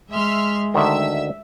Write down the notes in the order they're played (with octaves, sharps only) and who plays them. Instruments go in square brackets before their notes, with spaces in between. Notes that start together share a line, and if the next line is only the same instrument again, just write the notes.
[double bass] G#3 [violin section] E5 C6 F6
[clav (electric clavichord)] D2 D3 D#3 [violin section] E5 E6